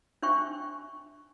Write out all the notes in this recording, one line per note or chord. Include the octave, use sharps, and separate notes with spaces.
D4 C5 E5 G5 C#6